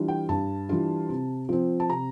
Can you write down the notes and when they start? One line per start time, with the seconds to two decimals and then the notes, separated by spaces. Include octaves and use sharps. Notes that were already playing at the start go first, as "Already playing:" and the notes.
Already playing: E3 G3 D4 F4
0.08 G5
0.29 G2 A5
0.69 E3 G3 D4 F4
1.09 C3
1.49 F3 C4
1.80 A5
1.89 C3 A#5